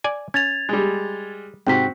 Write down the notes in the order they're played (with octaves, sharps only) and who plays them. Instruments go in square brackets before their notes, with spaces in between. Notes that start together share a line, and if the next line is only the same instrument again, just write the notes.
[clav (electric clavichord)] D5 G#5
[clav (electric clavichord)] C#4 [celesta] G#6 A6 F7
[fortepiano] G3 G#3
[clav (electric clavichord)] G#2 C3 [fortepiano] C4 F#4 [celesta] G5 B6